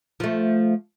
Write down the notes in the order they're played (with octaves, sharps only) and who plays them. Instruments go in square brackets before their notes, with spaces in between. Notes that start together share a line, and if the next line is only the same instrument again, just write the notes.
[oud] F3 A3